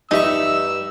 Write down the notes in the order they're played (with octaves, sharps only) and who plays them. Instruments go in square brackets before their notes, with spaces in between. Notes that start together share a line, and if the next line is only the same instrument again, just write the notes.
[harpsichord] G2 C#6 [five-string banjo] D#4 E5 [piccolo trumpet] E6